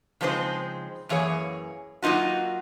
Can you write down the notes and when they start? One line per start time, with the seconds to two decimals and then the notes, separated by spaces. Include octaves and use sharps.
0.21 C#3 F3 G#3 C4 D#4 C5
1.09 F#2 E3 A#3 G#4 C#5
2.02 F#3 A#3 D#4 F4 F#4